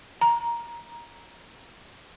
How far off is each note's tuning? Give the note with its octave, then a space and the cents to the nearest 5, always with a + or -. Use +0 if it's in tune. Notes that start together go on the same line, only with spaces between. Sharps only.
A#5 +10